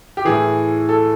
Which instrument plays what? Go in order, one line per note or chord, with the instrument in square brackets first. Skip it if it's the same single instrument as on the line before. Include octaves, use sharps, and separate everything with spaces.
[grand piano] G4
A2 E3 G#4
A4